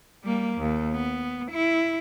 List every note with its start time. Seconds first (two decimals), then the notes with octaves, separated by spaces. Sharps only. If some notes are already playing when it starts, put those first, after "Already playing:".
0.24 G3 A#3
0.58 D#2
0.94 B3
1.51 E4